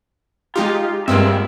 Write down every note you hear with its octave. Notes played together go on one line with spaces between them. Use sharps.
G#3 D#4 F4 G4
G2 G#3 A#3 C4 F4 E5